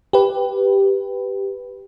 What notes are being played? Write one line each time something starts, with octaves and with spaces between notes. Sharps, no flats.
G4 B4